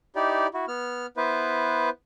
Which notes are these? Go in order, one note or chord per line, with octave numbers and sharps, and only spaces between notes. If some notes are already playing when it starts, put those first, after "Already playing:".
D#4 E4 G4 D5
E4 F#4
B3 F6
B3 E4 B4 C5